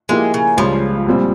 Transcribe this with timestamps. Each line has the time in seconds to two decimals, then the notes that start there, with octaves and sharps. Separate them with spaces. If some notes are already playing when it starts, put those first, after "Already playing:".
0.09 F3 G#3 A#3 E4 G4
0.34 C#3
0.57 C#2 C#3 F3 G3
1.07 C2 A#2 G3 C4